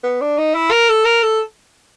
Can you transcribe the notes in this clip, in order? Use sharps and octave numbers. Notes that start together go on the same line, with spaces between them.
B3
D4
D#4
E4
A#4
A4
A#4
A4